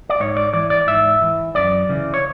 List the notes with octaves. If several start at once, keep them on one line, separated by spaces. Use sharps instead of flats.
D5
G#2 C#5
D5
E3 D5
D5
G#2 E5
E3
F#2 D5
C#3 E3
C#5